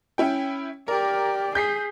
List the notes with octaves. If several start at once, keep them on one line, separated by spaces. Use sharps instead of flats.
C#4 E4 G5
G4 A#4 D5
G#4 G6 B6 C7